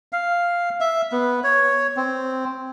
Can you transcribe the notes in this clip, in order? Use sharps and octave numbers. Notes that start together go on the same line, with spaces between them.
F5
E5
B3
C#5
C4